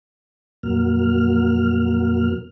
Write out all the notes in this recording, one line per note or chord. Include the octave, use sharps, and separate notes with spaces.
F2 A#2 F#3 A#3 F6